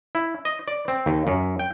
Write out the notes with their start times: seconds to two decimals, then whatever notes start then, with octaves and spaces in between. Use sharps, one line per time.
0.15 E4
0.45 D#5
0.68 D5
0.88 C4
1.06 D#2
1.27 F#2
1.59 G5